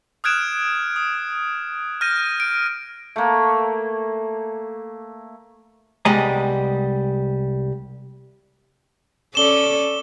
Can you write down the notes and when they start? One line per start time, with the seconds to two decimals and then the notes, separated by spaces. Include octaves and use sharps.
0.24 D#6 F6 F#6 G#6 D7 E7
0.96 D#6
2.01 F6 G6 A#6 D#7
2.40 D7
3.16 A3 A#3
6.05 C2 G3 G#3 B3 D#5 A#5
9.35 C#4 A4 D5 E7 G7